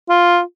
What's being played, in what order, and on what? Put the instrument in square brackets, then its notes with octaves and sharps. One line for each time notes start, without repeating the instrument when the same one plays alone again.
[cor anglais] F4